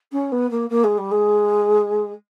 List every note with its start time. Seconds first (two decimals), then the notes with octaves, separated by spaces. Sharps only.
0.12 C#4
0.32 B3
0.50 A#3
0.69 A#3
0.84 G#3
0.98 G3
1.11 G#3